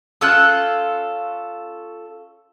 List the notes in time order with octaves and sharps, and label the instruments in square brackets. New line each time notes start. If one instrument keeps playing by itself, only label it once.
[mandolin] C#4 F4 A4 [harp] E6 F#6